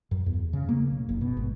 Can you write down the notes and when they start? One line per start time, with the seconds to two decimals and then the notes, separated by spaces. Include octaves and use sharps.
0.11 F#2
0.26 E2
0.53 C#3
0.69 A#3
0.91 B1
1.09 F#1
1.21 B2
1.37 G#1